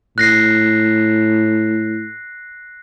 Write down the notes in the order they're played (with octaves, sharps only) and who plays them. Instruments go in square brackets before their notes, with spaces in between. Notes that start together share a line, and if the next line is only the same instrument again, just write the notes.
[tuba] A2 [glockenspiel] F#6 A#6 C7